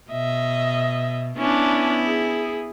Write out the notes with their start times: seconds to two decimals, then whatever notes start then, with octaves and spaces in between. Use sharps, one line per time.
0.11 B2 D#5 E5
1.38 B3 C#4 D4 E4
2.05 G#4